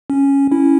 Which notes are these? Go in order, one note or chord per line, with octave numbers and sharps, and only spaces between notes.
C#4
C#4 E4